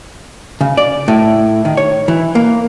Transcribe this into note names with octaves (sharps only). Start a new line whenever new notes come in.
C#3
D5
A2
D#3
C#5
E3
A#3